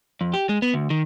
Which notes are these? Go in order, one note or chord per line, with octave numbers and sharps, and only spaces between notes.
F2
G4
G#3
B3
D2
D#3